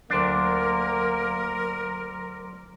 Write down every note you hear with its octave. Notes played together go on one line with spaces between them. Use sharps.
D2 F#3 A#3 D4 A#4 C6 D6